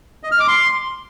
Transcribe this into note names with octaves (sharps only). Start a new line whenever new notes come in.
D#5
F6
D6
C6